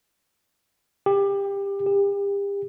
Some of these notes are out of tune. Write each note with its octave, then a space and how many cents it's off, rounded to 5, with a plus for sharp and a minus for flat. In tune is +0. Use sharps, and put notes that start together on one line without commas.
G4 +20
G4 +35